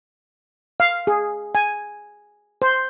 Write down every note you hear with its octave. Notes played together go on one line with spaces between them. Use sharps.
F5
G#4
G#5
C5